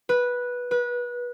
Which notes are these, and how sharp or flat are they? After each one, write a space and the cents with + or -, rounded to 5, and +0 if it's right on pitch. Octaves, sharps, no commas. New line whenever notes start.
B4 -10
B4 -25